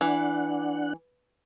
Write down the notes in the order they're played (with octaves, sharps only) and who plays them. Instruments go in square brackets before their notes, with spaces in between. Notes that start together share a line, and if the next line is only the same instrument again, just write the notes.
[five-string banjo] E3 [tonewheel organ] D4 F#5